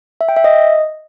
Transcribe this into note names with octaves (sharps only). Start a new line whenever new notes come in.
E5
G5
E5
D#5